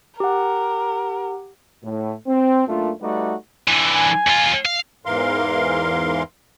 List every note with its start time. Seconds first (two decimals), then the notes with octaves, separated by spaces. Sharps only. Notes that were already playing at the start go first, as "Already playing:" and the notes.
0.20 G4 A#4 F#5
1.83 A2
2.27 C4
2.68 F#2 A3 A#3 D4 F4
3.01 G3 A3 D#4 F#4 B4 D5
3.68 D3 E3
3.94 G#5
4.27 D#2 F4
4.66 F5
5.05 E2 G#2 E3 A#4 F5 C6